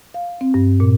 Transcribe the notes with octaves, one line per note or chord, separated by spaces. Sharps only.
F5
C4
G2
A#2